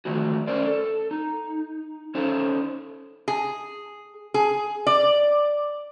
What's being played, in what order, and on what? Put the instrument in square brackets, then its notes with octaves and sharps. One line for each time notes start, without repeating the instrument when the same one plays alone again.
[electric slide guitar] D3 D#3 F3 G#3 A3 F#4
C#4 A#4 C5 D5
A4
D#4
C#4 D#4 A4 C5
[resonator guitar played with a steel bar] G#4
G#4
D5